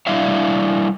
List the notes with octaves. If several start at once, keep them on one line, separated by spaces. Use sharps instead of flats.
G3 D4 E4 D5 E5 F5